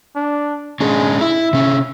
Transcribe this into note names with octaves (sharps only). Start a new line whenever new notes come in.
D4
G#3 C#4 D4 G#4
E4 E5
C3 C#4